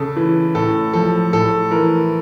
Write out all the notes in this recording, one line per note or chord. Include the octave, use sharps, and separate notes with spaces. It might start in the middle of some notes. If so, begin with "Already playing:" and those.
Already playing: C#3 A4
E3
A2 A4
F3 A4
A2 A4
E3 A#4